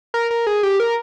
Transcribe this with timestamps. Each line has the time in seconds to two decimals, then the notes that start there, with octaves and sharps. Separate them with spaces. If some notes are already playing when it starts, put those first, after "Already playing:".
0.14 A#4
0.31 A#4
0.47 G#4
0.63 G4
0.80 A#4